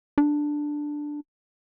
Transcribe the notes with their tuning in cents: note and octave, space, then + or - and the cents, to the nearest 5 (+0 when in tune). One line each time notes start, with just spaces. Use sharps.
D4 +5